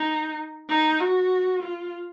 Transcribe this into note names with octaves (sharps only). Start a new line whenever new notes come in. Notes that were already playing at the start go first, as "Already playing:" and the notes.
Already playing: D#4
D#4
F#4
F4